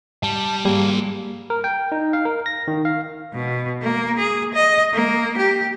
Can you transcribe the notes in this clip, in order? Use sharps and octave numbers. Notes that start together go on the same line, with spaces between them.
G3 A5
G3 A#3 G#4 A#4
A#4
G5
D#4
F5
A#4
A#6
D#3
F5
B2
A#3
G#4
D#5
A#3
G4